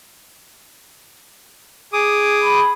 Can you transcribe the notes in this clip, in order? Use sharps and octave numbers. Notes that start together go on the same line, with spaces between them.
G#4 D6 D#6
B5